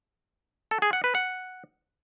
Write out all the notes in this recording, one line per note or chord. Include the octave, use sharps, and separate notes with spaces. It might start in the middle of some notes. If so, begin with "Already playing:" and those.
A4
G#4
F#5
B4
F#5